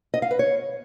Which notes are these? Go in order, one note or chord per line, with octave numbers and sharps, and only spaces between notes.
D#5
F5
B4
C#5